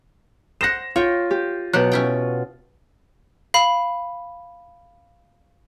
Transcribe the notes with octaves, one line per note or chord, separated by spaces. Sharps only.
C5 F#5 A#6 E7
F4 C#5 G5
G4
B2 F#3 G4 F#6
C#4 E4 G5
F5 B5